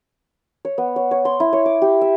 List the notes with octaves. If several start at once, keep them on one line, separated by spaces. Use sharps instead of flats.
C#5
B3
C#5
C#5
C6
E4
C#5
D6
G4
E5